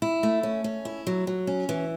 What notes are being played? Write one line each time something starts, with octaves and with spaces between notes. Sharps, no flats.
E4
A3
C#4
C#4
E4
F#3
F#3
C#4
E3